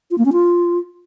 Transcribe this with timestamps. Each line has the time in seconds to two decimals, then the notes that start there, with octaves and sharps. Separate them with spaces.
0.11 F4
0.18 A#3
0.25 C#4
0.33 F4